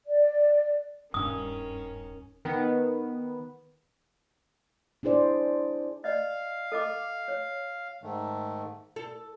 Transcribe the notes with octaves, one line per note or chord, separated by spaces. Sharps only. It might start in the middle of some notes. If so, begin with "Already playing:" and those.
D5
D#1 G2 D#3 C#4 D#6
D#3 B3
D4 E4 G#4 C5 D5
D5 D#5 F5
A4 D#5 D6
C#5
G#2 D#3 A3
A4